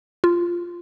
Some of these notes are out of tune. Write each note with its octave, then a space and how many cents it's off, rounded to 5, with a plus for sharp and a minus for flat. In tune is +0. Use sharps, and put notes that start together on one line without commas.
F4 -10